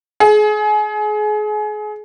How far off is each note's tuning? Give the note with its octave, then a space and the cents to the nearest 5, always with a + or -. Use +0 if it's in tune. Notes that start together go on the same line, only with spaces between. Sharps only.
G#4 +30